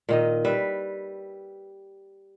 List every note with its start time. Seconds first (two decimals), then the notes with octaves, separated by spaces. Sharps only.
0.09 A#2 D#3 D#5
0.45 G3 B4 E5